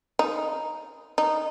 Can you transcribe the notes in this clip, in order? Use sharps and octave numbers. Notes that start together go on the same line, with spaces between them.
D#4
D#4